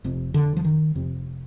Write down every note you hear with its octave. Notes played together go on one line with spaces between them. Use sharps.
F1 F2 C3
D3
F3
D#3
F1 F2 C3